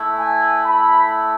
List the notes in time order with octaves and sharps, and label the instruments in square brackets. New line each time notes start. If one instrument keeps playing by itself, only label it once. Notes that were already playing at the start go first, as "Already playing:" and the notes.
Already playing: [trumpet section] A3 E4
G#5
B5